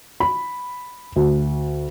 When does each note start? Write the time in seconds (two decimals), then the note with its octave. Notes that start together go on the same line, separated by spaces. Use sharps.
0.20 B5
1.16 D2